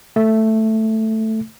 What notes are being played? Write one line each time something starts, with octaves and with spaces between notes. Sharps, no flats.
A3